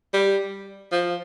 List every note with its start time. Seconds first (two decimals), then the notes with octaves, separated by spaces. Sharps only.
0.13 G3
0.92 F3